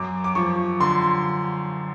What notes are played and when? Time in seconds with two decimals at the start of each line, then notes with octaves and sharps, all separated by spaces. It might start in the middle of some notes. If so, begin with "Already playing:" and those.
Already playing: F#2 D6
0.24 D6
0.35 F3 C#6
0.80 D3 C6